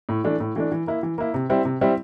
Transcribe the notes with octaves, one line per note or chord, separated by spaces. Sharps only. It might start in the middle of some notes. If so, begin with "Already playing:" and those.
A2
E3 A3 D4
A2
E3 A3 D4
E3
A#3 E4
E3
A#3 E4
C3
G3 C4 E4
C3
G3 C4 E4